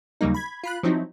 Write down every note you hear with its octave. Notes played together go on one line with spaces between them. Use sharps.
D#2 C#3 F#3 G3 A#3 D#4
B5 G#6
F4 B5 F#6
F3 F#3 C4 D#4 E4